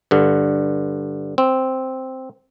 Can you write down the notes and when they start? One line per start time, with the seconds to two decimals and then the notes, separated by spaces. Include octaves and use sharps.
0.11 G2 D3
1.38 C4